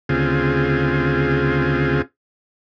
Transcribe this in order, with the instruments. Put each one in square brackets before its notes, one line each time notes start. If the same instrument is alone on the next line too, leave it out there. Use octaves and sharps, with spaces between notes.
[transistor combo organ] D2 C#3 C4 F4 G#4